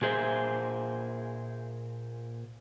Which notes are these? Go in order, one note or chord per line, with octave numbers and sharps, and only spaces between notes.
A#2 G#4 C5 E5